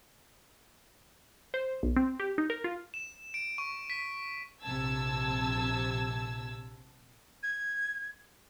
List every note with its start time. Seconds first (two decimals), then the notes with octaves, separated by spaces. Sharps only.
1.54 C5
1.83 B1
1.96 C4
2.20 G4
2.38 D#4
2.50 A#4
2.64 F4
2.94 E7
3.34 D7
3.58 C#6
3.90 B6
4.62 A#1 C3 A5 E6 G#6
7.43 G#6